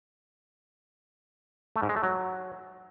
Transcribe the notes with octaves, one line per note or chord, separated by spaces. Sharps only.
A3
G#2
G#3
A3
F#3